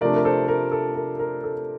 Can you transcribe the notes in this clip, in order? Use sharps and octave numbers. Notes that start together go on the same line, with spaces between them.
C3 F3 A3 D4 A#4 D5
A#4
A4 C5
A#4
A4
A#4
A#4
A4